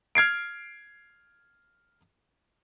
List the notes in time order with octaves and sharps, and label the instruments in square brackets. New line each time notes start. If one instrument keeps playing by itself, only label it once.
[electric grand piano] F6 G#6 C7 D7